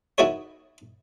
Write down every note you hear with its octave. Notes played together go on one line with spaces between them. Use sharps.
D#4 E4 F#4 G#4 A#4 C#5